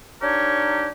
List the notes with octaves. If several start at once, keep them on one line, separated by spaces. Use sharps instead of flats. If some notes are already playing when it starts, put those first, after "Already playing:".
D4 D#4 G4 A#4 C#5